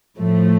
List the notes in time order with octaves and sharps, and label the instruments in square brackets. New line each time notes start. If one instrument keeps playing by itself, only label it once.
[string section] A2 F3 A3